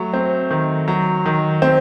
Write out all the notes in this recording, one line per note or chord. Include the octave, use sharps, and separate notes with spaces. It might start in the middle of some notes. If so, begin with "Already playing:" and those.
Already playing: F#3 A3
C4
D#3
F#3
D#3
C4